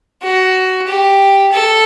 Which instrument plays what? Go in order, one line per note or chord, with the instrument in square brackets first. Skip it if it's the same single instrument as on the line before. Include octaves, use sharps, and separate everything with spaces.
[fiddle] F#4
G4
A4